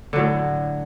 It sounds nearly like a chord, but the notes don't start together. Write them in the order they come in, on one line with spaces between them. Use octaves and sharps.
D3 F#3 A2